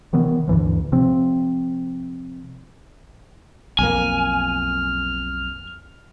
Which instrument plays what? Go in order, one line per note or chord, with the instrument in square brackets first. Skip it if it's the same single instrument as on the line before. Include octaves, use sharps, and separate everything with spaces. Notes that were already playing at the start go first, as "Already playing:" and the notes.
[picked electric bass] C3 D#3 E3 B3
D2 G2 E3 F3
C3 F3 C4
[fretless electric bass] B1 F2 A#3 [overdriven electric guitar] G#5 [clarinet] F6